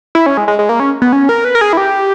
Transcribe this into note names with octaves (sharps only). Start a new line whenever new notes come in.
E4
C#4
G#3
G#3
G#3
A#3
C#4
B3
C#4
A#4
B4
A#4
G#4
E4
G4